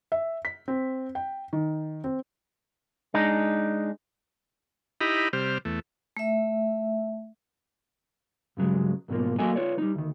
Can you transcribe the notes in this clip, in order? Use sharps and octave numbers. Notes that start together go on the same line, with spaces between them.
E5
B6
C4
G5
D#3
C4
G#3 D4 D#4
D#4 E4 G4 D#5 A#5 B5
C3 G3 C5 F6
E2 A3
A3 E5
G2 C#3 F#3 G#3
B1 G#2 B2 F3 A#3
F#3 A#3 F#4 A4 D#5 G#5
F4 G#4 B4 C#5 D5
G3 D#4
D2 D#3